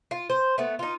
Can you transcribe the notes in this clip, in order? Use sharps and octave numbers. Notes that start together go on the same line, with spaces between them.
F4
C5
A3 B3
D#4 F4